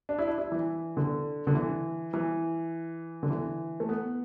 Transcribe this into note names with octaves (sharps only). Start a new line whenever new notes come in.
D4
E4
D4
E4
E3
D3
D3
E3
E3
D3
E3
A3
B3